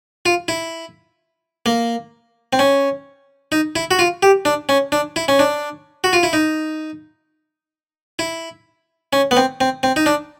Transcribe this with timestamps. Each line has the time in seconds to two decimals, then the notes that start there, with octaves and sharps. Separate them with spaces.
0.26 F4
0.48 E4
1.66 A#3
2.53 C4
2.59 C#4
3.52 D#4
3.76 E4
3.91 F#4
3.99 F4
4.23 G4
4.45 D4
4.69 C#4
4.92 D4
5.16 E4
5.28 C#4
5.39 D4
6.04 F#4
6.13 F4
6.23 E4
6.33 D#4
8.19 E4
9.13 C#4
9.31 B3
9.37 C4
9.61 C4
9.83 C4
9.96 D#4
10.06 D4